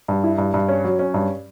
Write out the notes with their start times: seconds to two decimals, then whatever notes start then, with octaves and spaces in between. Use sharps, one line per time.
0.08 G2
0.24 E4
0.38 G2
0.54 G2
0.69 C#4
0.84 F#3
0.99 C#4
1.14 G2